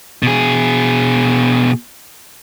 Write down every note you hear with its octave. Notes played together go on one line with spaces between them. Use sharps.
B2 G#4